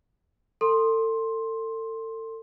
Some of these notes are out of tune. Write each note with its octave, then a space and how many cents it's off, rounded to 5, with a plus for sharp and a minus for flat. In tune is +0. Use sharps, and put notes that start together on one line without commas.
A4 +30 C6 +10